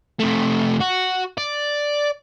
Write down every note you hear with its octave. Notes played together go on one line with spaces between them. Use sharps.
C3 A3
F#4
D5